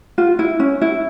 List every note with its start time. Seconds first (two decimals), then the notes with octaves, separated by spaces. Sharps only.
0.18 F4
0.39 E4
0.60 C#4
0.81 E4